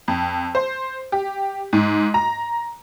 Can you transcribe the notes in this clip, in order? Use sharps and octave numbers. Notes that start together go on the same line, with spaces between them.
F2
C5
G4
G#2
A#5